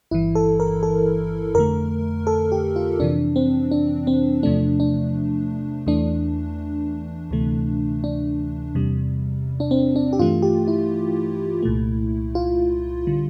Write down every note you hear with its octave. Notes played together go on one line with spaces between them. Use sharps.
G1 G2 E3 E4
A4
A#4
A4
F2 D3 A3 A#4
A4
G4
F4
F2 C3 E3 D4
C4
D4
C4
E2 C3 F3 A3 D4
D4
E2 E3 A3 D4
D2 C3 E3 A3
D4
E2 C3 G3
D4
C4
D4
G4
G2 E3 A3 F4
G4
E4
C2 A#2 A3
F4
D3 G3